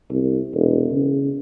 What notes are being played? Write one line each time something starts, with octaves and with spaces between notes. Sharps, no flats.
C2
E1
C#3